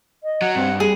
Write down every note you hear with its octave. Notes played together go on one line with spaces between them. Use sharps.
D#5
F#3 F#5
G2 C4
G3 G#4